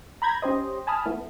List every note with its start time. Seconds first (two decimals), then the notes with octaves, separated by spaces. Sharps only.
0.22 A#5 B5 G6 G#6 A#6
0.42 C#4 G4 C5 D#5
0.87 G#5 A5 B5 D#6 F6
1.06 E3 A3 B3